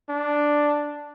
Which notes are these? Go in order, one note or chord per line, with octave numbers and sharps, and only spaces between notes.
D4